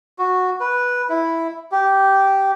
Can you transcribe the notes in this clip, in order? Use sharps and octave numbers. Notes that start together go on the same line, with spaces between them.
F#4
B4
E4
G4